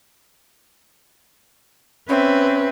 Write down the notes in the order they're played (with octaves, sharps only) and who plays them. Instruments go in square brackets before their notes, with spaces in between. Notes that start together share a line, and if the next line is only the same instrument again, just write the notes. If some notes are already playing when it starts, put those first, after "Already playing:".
[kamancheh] C4 E5 [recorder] C#4 [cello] B4